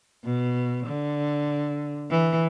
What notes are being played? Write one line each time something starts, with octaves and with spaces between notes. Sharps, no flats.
B2
D3
E3